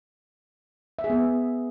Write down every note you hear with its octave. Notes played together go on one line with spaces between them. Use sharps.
E5
G#4
B3